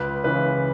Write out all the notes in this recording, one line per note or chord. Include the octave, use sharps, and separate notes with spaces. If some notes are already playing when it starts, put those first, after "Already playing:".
Already playing: C#2 B4
C#3 E3 B4